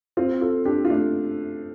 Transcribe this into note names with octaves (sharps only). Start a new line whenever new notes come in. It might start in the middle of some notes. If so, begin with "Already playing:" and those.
C4 F4
F4 A4
D4 G4
F4
A3 D4